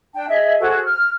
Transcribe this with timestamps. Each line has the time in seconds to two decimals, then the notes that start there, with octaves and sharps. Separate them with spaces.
0.14 D4 G5 A5
0.28 G#4 D#5 E5
0.59 F#4 G#4 A4 C5
0.84 F6